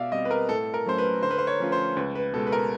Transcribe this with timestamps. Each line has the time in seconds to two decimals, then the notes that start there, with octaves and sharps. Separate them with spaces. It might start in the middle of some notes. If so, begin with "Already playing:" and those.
Already playing: B2 D5 E5 F5
0.12 G3 D#5
0.15 C4
0.25 B4
0.31 A#4
0.49 A2 A4
0.74 A#4
0.86 F#3 A3 C#4 C5
0.98 B4
1.22 D3 C5
1.31 B4
1.38 C5
1.47 C#5
1.60 F3 A3 C#4 F4
1.72 C5
1.97 C#2 B4
2.15 B4
2.33 B2 A4
2.38 G#3
2.47 B4
2.52 A#4